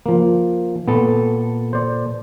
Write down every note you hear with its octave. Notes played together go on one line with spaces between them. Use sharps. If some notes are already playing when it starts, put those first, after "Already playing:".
F3 A#3
A#2 B3 A4
C5 D5